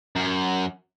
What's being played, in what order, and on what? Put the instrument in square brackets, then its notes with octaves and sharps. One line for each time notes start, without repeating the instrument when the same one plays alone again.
[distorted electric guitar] F#2